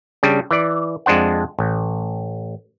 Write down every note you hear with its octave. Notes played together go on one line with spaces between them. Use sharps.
C#3 G3 D4
E3 D5
F2 G#3 D4 C5 F#5
A1